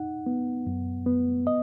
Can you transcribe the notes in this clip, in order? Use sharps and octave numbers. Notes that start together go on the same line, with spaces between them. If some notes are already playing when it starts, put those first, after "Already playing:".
Already playing: D#4 F#5
B3
F#2
B3
D#5